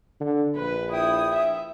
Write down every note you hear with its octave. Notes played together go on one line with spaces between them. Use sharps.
D3
A#1 B4
E4 G5 D#6
E5